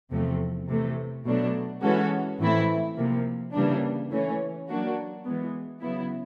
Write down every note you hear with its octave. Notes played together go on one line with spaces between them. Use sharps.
E2 C3 F3 A3 C4
C3 E3 A3
B2 F#3 A3 D4
E3 G#3 C#4 F#4 A4
A2 E3 A3 C4 E4
C3 F3 A#3
C#3 E3 G3 A#3 D4
E3 A3 C#4
F#3 A#3 D4 F#4
E3 G#3 B3
C#3 F#3 B3 E4